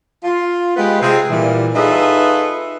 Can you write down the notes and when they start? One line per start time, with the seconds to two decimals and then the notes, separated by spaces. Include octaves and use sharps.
0.24 F4
0.77 G#3 B3 F4 G4 B4
1.01 C3 G#3 C4 F4 G#4
1.30 A#2 E3 G3
1.75 D#4 F4 G#4 A4 B4 E5